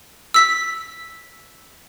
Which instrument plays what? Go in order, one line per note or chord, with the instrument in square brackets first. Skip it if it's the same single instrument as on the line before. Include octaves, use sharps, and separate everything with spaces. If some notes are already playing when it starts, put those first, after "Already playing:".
[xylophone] E6 B6